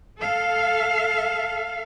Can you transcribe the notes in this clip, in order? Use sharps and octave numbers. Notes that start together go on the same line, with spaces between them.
A4 F5